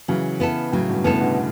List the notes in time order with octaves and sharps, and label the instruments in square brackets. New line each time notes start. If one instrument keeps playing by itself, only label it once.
[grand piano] C#3 E3 [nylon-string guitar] F#3
[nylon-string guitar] B3 E4 A4
[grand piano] A2 C#3 [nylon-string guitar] F#3
[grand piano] G2 B2
[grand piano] A2 C#3 [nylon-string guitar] B3 E4 A4
[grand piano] B2 D3